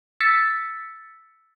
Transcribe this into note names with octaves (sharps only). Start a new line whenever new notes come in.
E6 A6 B6 C#7